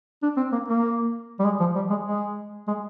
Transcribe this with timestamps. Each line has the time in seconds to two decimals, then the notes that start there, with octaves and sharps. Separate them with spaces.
0.23 D4
0.37 C4
0.52 A#3
0.68 A#3
1.40 G3
1.45 G#3
1.60 F3
1.76 G3
1.90 G#3
2.05 G#3
2.68 G#3